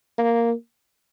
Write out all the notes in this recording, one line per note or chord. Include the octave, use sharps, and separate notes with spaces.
A#3